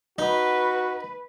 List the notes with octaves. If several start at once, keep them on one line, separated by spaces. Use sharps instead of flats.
D#4 F#4 B4